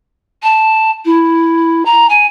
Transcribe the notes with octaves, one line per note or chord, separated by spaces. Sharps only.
A5
E4
A#5
G#5